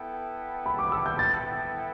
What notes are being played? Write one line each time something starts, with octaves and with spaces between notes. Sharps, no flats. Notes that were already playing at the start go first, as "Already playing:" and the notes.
Already playing: B3 E4 A4 G5
B5
D6
E6
G6
A6